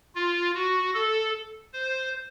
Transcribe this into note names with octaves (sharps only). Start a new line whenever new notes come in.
F4
F#4
A4
C5